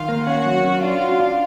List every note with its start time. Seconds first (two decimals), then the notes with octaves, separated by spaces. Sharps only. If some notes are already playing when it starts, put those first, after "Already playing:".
Already playing: D#3 F4 F5
0.09 A#3
0.27 C#4 F#4 F#5
0.46 F#3
0.64 C#4
0.83 D4 F4 F5
1.01 F#4
1.20 D4